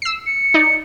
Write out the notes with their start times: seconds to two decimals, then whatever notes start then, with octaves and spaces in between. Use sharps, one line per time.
0.02 E6 C7
0.26 C#7
0.54 D#4 D5